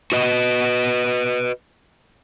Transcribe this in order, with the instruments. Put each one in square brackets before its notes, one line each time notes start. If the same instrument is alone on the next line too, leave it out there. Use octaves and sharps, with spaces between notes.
[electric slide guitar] F#4 B4 D#5